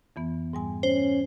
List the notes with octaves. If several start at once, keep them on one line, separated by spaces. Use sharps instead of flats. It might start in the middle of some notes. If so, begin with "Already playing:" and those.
F2 E3 B3
G#2 G3 G#5
C#4 C5